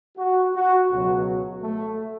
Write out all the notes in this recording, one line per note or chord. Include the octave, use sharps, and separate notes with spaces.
F#4
F#4
C#2 B2 F#3 F#4
A3